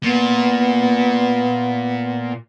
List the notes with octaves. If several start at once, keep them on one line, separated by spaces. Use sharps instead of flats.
A#2 B3